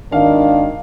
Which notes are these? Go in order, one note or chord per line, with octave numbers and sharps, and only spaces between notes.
G#1 D#3 D4 F5